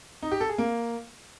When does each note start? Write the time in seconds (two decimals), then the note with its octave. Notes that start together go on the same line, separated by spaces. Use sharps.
0.23 D#4
0.31 G4
0.40 A4
0.49 G#4
0.58 A#3